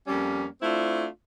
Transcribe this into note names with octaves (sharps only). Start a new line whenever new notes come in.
F2 G3 A#3 C#4
A3 C4 D4 E4 F4